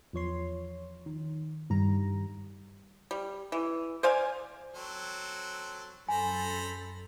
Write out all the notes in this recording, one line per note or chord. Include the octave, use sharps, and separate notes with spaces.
E2 F3 C#5 C6
D#3
G2 D#3 G3 A#5
G3
E3
C5 D5 F5 G#5
F#3 C4 A4
F#2 A4 C5 G#5 A#5 B5